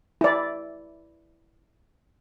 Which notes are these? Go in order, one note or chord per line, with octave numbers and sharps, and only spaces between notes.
E4 D5